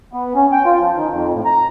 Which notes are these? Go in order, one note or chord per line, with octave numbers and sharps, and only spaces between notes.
B3
C#4
G5
F4
F3
D#3
F2
A2
A#5